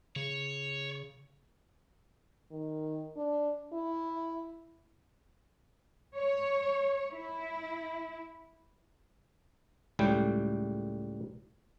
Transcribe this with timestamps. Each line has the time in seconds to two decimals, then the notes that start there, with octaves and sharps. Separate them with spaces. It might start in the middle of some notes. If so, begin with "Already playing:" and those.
0.16 C#3 C#5
2.51 D#3
3.16 D4
3.73 E4
6.15 C#5
7.11 E4
9.99 C#2 A2 G3 G5